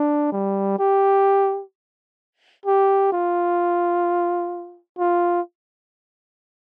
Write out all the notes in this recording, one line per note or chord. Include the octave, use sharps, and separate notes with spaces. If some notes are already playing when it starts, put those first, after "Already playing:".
Already playing: D4
G3
G4
G4
F4
F4